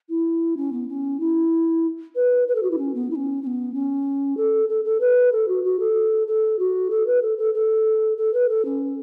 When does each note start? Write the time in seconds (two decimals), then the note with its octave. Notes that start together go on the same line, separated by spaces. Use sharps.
0.09 E4
0.57 C#4
0.73 B3
0.89 C#4
1.20 E4
2.15 B4
2.48 B4
2.55 A4
2.63 F#4
2.71 E4
2.78 C#4
2.95 B3
3.11 E4
3.15 C#4
3.43 C#4
3.47 B3
3.74 C#4
4.37 A4
4.69 A4
4.85 A4
5.00 B4
5.32 A4
5.48 F#4
5.64 F#4
5.80 A4
6.27 A4
6.59 F#4
6.90 A4
7.07 B4
7.22 A4
7.38 A4
7.54 A4
8.17 A4
8.34 B4
8.49 A4
8.65 C#4